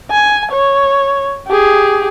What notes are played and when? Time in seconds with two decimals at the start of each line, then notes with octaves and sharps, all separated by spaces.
0.11 G#5
0.51 C#5
1.47 G4 G#4